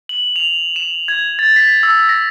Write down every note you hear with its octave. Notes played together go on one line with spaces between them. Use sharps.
F#7
F7
E7
G#6
A6
B6
E6
A#6